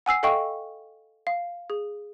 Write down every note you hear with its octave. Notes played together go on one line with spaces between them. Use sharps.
F#5 G#5 E6 C7
A4 D#5 F5 G5 C#6
F5
G#4